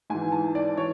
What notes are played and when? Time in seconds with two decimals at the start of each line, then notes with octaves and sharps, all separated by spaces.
0.10 G#2 E3 G#5
0.32 A5
0.55 D5
0.77 E3 C#5